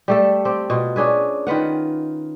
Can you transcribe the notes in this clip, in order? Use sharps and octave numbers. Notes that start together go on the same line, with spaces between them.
G3 A3 A4
C4 G4
B2 F4
C#4 D4 G#4 B4
D#3 F4 B4 F#5